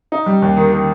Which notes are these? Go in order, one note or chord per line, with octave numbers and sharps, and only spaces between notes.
D#4
G3
D#2
D#3
D#3